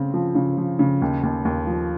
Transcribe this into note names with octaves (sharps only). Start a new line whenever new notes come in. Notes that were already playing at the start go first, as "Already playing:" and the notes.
Already playing: C#3 C4
F3
C#3
F3
C#3
D#2
D#2
D#2
F3